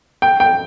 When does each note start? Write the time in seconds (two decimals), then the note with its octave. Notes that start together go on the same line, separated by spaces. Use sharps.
0.22 G5
0.40 G5